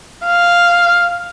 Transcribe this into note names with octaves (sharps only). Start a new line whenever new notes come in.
F5